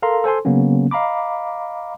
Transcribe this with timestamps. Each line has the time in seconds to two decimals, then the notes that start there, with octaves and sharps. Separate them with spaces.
0.02 A4 A#4 F5 A#5 C6
0.24 A4 C5 G#5 C6
0.45 C#3 F#3 A#3 B3 C#4
0.91 D#5 F5 A#5 B5 D6